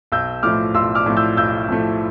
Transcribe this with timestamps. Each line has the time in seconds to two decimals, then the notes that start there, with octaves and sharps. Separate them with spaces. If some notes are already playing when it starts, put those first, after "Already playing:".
0.12 B1 E6 G6
0.43 A2 F3 A3 D6 F6
0.74 B1 C6 E6
0.95 D6 F6
1.06 A2 F3 A3
1.17 E6 G6
1.37 B1 E6 G6
1.69 A2 F3 A3